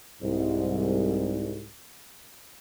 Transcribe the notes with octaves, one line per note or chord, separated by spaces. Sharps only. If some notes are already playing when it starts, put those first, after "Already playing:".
C2 G#2